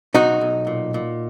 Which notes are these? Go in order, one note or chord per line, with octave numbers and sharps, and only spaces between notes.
B1 D#4 F#4
B1
A#2
A#2